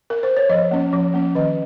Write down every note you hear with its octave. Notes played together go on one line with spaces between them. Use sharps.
A#4
C5
C#5
F3 D#5
A#3 C#4
F3
A#3 C#4
D#3 D#5